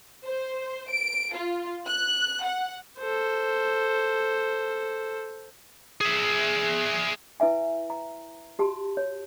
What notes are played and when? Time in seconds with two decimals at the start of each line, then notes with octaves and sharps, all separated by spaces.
0.25 C5
0.90 D7
1.34 F4
1.86 F#6
2.44 F#5
2.98 A4 C5
6.01 G#4 E5
7.40 E4 B4 E5 G#5
7.90 A#5
8.59 F#4 G4 A5
8.97 C#5